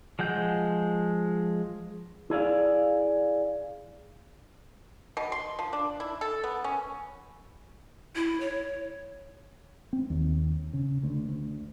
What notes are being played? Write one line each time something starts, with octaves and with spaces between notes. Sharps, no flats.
F3 G#3 F#5 G6
E4 G#4 D5 F5
B2
C6
F3
D4
E4
A4
B3
C#4
E4
C#5
C4
D#2
C#3
D2
D2